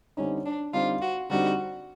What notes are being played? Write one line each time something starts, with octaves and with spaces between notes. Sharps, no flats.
D3 G3 C4 C#4 D#4
D4
D3 G3 C4 D#4 F4
F#4
D3 G3 C4 D#4 F#4